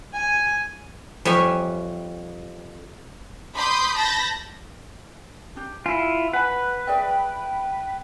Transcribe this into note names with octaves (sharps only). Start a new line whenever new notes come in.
G#5
F2 G3 C#5 E5 G#5
B5 C6 D6 D#6 G6
A5 B5 G6 A6 A#6
D4 G4
E4 F4 G#5
B4 F#5 G#5
G#4 D5 E5 G5